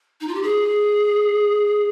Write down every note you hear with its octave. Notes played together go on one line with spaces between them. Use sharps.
D#4
F4
G4
G#4